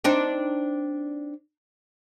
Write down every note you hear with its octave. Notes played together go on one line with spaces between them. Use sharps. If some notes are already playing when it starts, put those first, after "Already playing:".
C4 D4 D#4